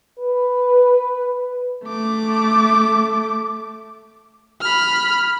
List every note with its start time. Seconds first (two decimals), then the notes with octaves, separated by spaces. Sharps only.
0.19 B4
1.85 A3 D6
4.61 B5 F6